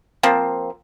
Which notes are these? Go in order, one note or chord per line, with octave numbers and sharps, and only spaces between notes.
F3 A#3 C4